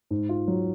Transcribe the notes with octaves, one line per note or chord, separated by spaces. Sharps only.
G#2
F4
F#3